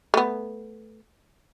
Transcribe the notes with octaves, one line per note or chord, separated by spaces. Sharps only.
A3 B3